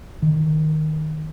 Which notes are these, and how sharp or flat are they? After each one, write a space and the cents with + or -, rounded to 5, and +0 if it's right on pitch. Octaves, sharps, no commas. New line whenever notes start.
D#3 -5